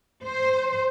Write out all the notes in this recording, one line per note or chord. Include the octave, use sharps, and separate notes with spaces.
C5